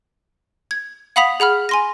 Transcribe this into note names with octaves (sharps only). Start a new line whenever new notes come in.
G#6
F5 F#5 B5 D#6 B6 F7
G#4 F#5 B5 F6
G#5 C6 A#6